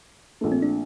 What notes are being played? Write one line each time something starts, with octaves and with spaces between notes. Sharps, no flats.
A#1 A#2 A3
C4
D4